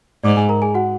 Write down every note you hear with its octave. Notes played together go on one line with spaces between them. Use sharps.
G#2 D5 D6
G#4 G#5
A#4 A#5
G#4 G#5
F#4 F#5